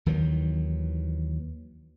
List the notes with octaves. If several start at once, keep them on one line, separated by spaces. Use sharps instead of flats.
D#2 D#3 E3 F#3